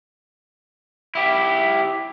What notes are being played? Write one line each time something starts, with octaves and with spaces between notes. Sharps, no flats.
E4 G4